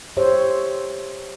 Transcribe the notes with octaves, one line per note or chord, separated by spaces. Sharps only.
G4 C5 C#5 E5